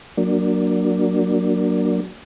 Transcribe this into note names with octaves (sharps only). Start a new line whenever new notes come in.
F#3 A#3 D4